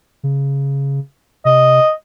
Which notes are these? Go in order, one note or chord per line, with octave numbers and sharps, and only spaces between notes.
C#3
C3 D#5